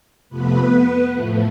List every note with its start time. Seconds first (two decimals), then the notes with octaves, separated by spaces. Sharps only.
0.29 F2 C3 F3 A3 B3 B4
1.13 A2 F3 A3